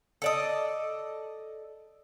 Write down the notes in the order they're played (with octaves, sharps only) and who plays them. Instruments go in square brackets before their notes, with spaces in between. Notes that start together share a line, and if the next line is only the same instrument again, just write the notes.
[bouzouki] A4 D5 D#5